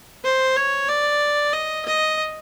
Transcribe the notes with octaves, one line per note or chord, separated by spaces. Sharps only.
C5
C#5
D5
D#5
D#5